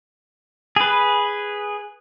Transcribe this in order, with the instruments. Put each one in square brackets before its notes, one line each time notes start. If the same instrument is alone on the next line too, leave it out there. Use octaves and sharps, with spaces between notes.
[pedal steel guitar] G#4 B4